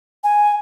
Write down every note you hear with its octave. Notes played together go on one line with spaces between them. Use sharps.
G#5